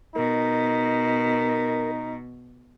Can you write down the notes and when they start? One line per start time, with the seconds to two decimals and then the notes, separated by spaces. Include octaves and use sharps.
0.16 B2 D#4 A#4